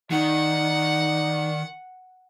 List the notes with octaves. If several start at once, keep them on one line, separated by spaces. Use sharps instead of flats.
D#3 D#4 D5 F#5